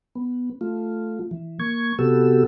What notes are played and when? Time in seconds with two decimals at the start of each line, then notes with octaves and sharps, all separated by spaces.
0.15 B3
0.61 A3 F4
1.31 E3
1.59 A#3 C#6 G#6
1.99 C3 B3 F#4 G4 A4 E6